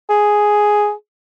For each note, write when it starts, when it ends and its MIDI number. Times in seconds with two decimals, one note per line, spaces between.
0.10 0.92 68